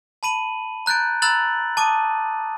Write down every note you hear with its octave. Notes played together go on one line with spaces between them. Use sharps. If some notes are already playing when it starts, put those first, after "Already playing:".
A5 B5 D#7 F#7
A#5 F#6 G6 A6 D7
A#5 B5 E6 F#6 A6 F#7
A5 D6 D#6 D#7